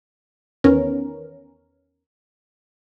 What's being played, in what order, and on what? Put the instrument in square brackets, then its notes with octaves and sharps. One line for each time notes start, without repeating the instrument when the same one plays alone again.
[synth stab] E2 D#3 B3 C#4 A#4